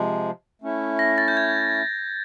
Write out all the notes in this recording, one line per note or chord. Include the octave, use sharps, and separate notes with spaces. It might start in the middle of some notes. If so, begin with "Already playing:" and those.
Already playing: C3 F3 G#3
A3 C#4 E4
A#6
A6
G6
G#6